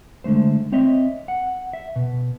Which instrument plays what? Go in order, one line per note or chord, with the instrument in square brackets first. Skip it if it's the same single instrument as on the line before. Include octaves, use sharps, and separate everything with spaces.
[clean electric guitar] D3 G#3 A3 C5
C4 C#5 D#5 E5
F#5
E5
B2